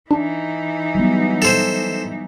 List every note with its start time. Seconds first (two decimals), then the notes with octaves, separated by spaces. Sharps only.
0.11 E3 D4 D#4
0.95 F#3 G3 B3
1.42 A4 C5